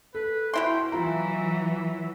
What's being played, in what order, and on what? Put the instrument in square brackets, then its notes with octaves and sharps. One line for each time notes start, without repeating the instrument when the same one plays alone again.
[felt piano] A4 [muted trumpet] B4
[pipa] B2 E4 C6 [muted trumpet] G5
[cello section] E3 F#3 [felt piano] F4 A#5 [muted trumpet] E5